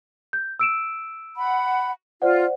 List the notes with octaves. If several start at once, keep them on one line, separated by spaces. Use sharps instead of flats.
G6
E6 D7 E7
F#5 B5
F4 C5 D5 F#5